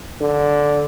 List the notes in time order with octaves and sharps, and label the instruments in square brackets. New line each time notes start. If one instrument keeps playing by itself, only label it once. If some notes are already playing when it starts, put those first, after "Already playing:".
[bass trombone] D3